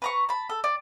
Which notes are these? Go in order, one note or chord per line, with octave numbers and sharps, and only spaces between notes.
B4 A#5 C#6
A5 B5
A4
D5